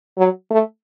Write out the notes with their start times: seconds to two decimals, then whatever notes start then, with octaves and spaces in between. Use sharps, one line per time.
0.18 F#3
0.51 A3